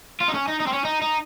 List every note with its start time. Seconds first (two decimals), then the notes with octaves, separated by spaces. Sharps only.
0.21 F4
0.29 D#4
0.35 C#4
0.48 D#4
0.61 D#4
0.67 C4
0.73 C#4
0.85 D#4
1.01 D#4